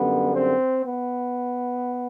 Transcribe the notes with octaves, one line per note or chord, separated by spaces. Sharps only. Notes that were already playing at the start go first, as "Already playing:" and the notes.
Already playing: F#2 D3 G3 A#3 B3
C4
B3